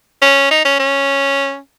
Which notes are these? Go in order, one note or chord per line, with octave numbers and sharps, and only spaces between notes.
C#4
D#4
C#4
C#4